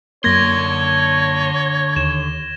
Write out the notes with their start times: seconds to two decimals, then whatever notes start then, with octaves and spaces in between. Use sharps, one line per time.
0.24 F#2 D3 A#3 C#5 C6 G#6 A#6 G7
1.96 D#2 E7